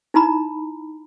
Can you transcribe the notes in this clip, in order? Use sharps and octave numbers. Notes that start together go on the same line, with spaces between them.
D#4 E4 A#5 B5